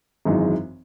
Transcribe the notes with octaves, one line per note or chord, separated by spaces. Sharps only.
G#1 F#2 E3 G#3 D#4